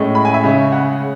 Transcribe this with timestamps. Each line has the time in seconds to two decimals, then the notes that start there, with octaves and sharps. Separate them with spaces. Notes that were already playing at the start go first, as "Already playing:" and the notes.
Already playing: A2 G#3 C#4
0.15 B5
0.25 G#5
0.34 E5
0.44 C#3 G#3 C#4
0.72 F#5